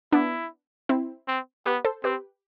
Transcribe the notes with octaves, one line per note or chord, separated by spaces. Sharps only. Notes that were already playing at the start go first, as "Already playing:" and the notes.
B3 D4 E4
C4 E4
C4
B3 G4 B4
A4 C5
C4 G4 B4